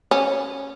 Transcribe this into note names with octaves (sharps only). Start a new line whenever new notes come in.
C#4